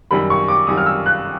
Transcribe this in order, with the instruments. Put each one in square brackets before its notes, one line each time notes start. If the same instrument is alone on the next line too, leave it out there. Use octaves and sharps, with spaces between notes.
[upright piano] F#2 D#3 G3 B5
C#6
D6
F#2 D#3 G3 D#6
F6
E6
F#6